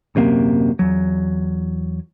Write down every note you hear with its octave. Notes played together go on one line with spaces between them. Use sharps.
D#1 F#2 C3 A#3
E2 F#3